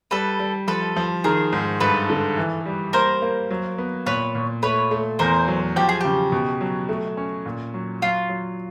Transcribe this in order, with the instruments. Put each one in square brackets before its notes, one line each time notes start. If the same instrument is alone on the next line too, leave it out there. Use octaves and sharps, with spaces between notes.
[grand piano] G3 [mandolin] A4 B4
[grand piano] G3
[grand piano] F3 [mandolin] A4 B4
[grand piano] F3
[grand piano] D#3 [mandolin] G#4 A#4
[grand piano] G#2
[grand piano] G2 [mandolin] A4 B4
[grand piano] D3
E3
G3
[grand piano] A#3 [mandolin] A#4 C5
[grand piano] A#3
F#3
B3
[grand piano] A#2 [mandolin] B4 C#5
[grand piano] A#2
[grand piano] A3 [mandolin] B4 C#5
[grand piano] A3
[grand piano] E2 [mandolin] A#4 C5
[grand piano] F#3
[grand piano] F3 [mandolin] G4
[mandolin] G#4
[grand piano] C#3 [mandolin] G4
[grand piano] B2
F#3
A3
C#4
A#2
F#3
[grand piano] F#3 [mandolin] F4
[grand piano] F#3